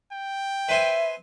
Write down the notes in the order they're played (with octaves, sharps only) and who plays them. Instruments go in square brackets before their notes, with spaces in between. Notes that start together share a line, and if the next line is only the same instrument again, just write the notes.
[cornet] G5
[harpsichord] B4 C5 G#5 [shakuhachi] E5